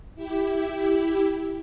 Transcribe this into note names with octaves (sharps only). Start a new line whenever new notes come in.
E4 G4